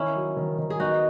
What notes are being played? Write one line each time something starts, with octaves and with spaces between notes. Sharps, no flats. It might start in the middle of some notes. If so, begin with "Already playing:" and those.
Already playing: D#3 C#4 E4
F#3
D#3
D#3
G#4
B3 D#4 F#4